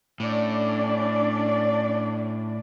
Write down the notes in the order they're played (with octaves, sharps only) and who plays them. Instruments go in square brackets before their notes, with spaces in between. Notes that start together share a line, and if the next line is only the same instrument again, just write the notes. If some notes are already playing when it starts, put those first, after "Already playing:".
[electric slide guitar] A2 [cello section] C#4 D4 D5